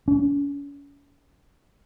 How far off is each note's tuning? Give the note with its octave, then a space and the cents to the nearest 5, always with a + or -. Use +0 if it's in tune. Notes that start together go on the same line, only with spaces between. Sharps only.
C#4 +40